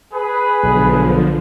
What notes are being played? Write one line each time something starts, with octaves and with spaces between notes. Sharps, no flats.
G#4 B4
B1 D3 F3